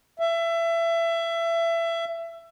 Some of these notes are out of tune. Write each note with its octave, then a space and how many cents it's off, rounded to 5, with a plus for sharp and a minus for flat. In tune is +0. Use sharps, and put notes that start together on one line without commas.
E5 +25